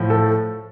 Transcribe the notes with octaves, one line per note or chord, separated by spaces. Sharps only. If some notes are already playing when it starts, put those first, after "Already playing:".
Already playing: A2 F3
A4